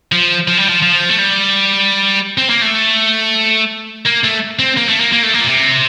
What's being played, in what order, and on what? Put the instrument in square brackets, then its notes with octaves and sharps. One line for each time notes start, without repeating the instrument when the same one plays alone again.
[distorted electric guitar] F3
F3
G3
F3
F3
A3
G3
C4
A#3
A3
A#3
A3
C4
A#3
A3
A#3
A#3
A3
A#3
A#2
C3